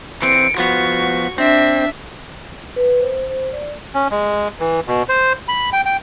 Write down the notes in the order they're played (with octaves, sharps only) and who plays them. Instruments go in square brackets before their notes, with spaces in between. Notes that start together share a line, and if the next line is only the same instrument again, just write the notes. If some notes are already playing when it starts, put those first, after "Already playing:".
[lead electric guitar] E3 C4 [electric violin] C#7 D7
[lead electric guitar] F3 B3 [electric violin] F#4 C#6
[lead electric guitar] C4 [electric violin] D4 E5
[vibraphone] B4
C5
C5
D5
[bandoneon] C#4
G#3
E3
B2
C5
B5
G5
G5